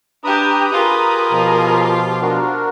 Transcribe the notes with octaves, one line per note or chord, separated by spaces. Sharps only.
D4 G4 B4 A#5 B5 D#6
F4 G4 G#4 A#4
B2 F3
D4 F#4 A#4